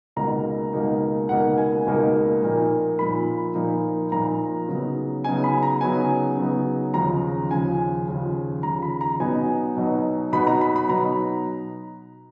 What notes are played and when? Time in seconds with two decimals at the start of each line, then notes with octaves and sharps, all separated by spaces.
0.16 C#2 B2 A#3 D#4 A#5
0.73 C#2 B2 A#3 D#4
1.29 C#2 B2 A#3 D#4 F#5
1.58 G#5
1.86 C#2 B2 A#3 D#4
2.43 A#2 F3 A#3 D#4
2.98 A#2 F3 A#3 D#4 B5
3.55 A#2 F3 A#3 D#4
4.12 A#2 F3 A#3 D#4 A#5
4.68 C#3 F#3 B3 D#4
5.24 C#3 F#3 B3 D#4 G#5
5.44 B5
5.63 A#5
5.81 C#3 F#3 B3 D#4 G#5
6.38 C#3 F#3 B3 D#4
6.94 D#2 C#3 F3 A#5
7.51 D#2 C#3 F3 G#5
8.07 D#2 C#3 F3
8.63 D#2 C#3 F3 A#5
8.82 B5
9.01 A#5
9.20 B2 F#3 B3 D#4 G#5
9.77 B2 F#3 B3 D#4
10.32 B2 F#3 B3 D#4 B5
10.47 A#5
10.61 B5
10.76 B5
10.89 B2 F#3 B3 D#4 A#5